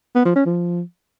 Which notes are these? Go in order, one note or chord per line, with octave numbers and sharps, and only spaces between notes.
B3
F3
C#4
F3